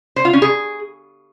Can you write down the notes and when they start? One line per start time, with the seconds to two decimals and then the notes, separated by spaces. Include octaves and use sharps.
0.16 C5
0.25 F4
0.33 C#4
0.42 G#4